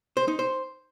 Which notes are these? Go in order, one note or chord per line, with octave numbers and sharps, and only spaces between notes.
C5
D#4
C5